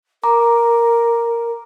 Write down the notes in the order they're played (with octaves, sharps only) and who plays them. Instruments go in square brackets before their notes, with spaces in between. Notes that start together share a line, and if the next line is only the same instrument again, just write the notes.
[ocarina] A#4 [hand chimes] A#5 D6